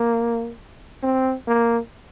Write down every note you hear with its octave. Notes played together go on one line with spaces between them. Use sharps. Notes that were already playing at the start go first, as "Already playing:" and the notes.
Already playing: A#3
C4
A#3